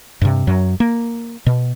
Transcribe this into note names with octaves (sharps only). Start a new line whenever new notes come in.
G2 C3
F#2 F#3
A#3
B2